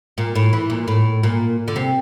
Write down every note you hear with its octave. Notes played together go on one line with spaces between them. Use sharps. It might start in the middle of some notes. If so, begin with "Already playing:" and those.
A#2
A2
E3
A#2
A2
A#2
D3
C3